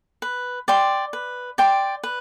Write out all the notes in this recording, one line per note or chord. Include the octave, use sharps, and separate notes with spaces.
B4
D5 G5 C6
B4
D5 G5 C6
B4